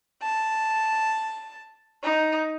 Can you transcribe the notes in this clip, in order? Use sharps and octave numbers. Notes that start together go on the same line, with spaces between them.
A5
D#4